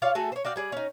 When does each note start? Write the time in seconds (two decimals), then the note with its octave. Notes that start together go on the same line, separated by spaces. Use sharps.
0.02 F4 C#5 D5 F5
0.15 A3 F#4 G#4 A4
0.32 C5 C#5
0.45 F#4 D5 F5 G5
0.56 G3 G#4 D5
0.72 C#4 D#4